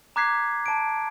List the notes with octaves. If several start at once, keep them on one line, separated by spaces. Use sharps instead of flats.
A#5 D6 F#6 G#6 B6 C7
A5 D7